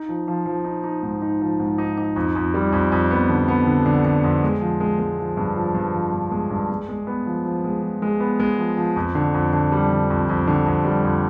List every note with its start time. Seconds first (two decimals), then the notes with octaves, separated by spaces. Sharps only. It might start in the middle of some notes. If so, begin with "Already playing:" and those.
Already playing: D#4
0.09 F3
0.28 F3
0.46 F3
0.65 D#4
0.84 D#4
1.03 G#2
1.22 D#4
1.41 F3
1.60 G#2
1.78 D#4
1.98 D#4
2.16 F2
2.35 F2
2.54 G3
2.72 F2
2.92 F2
3.11 B3
3.29 D3
3.48 B3
3.67 D3
3.86 D3
4.05 D3
4.24 F2
4.43 G#3
4.61 F3
4.80 G#3
4.99 G#3
5.18 F3
5.37 G2
5.56 F3
5.75 G2
5.94 F3
6.12 G2
6.32 G#3
6.51 G2
6.70 G#3
6.89 G#3
7.07 B3
7.26 F3
7.45 F3
7.64 G#3
7.82 F3
8.02 G#3
8.20 B3
8.40 G#3
8.58 F3
8.77 F3
8.96 F2
9.15 D3
9.34 F2
9.53 D3
9.72 G3
9.91 D3
10.10 F2
10.29 F2
10.47 D3
10.66 F2
10.85 G3
11.04 F2